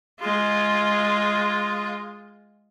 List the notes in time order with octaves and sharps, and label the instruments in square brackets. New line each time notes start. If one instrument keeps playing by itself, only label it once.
[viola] G#3 F4